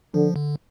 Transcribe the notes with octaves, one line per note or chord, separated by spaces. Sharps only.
D3 F3
D3